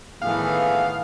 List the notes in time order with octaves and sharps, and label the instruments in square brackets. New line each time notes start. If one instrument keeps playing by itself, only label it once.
[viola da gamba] A2 D#3 E3 [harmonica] A3 B3 G#4 [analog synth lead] F5